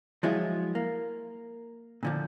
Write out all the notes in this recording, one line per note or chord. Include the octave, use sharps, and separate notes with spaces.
F3 F#3 G#3 E4 F4 G#4
A#3
A#2 D3 F3